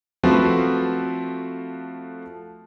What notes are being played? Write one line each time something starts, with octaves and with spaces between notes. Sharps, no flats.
F3 A3 C4 F#4 B4